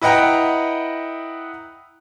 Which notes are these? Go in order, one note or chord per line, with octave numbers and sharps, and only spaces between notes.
E4 B4 D#5 F#5 G5 A#5